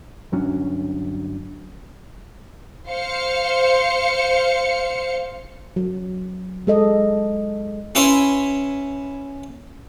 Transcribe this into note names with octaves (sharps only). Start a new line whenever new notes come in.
G1 F#3 C#4 D4
C5 F5 C#7
F#3
G#3 A4 D#5
C#4 E4 B4 C#5 G#5 C6